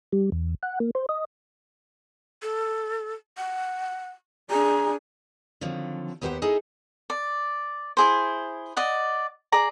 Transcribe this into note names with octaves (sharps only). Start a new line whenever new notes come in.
G3
E2
F#5
A#3
C5
D#5
A4
F#5
D4 G#4 A#5
D3 D#3 F3 F#3 C4
D#2 B3 G4 B4 C5 F#5
D#4 E4 G#4 A4 D#5
D5
E4 G#4 C5
D5 D#5 F#5
G#4 D5 A#5